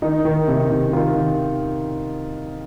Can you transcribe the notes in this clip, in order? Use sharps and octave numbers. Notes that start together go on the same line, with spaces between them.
D#3 D#4
D#3
C3
C3
D#3 F4
D#3